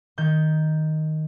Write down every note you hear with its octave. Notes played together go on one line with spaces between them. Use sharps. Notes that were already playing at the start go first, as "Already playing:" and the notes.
D#3 G6